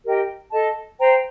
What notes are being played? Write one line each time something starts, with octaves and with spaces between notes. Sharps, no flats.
G4 A#4 D#5 G5
A4 D#5 A5
C5 G5 A#5